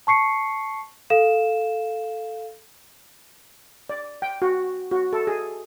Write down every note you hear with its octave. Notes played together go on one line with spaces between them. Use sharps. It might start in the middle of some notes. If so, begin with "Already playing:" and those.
A5 C#6 C7 C#7
A4 F5 E7
D5
G5
F#4
F#4
A4
G#4